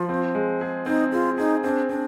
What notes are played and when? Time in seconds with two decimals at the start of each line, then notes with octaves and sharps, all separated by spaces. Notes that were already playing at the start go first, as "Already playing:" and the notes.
Already playing: F3 F4
0.09 C4
0.35 G#3
0.61 G#4
0.86 C4 D#4
1.12 F4 G#4
1.38 D#4 G#4
1.64 C4 D4
1.89 C4 D4